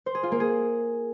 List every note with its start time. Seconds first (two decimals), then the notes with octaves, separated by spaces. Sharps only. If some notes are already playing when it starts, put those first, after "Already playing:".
0.06 C5
0.15 G#4
0.23 F4
0.32 A#3
0.40 G#4